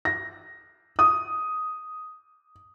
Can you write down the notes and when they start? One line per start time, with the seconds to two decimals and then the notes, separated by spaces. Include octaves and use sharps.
0.05 A#6
0.99 D#6